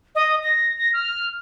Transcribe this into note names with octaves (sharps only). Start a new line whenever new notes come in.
D#5
A#6
A#6
F6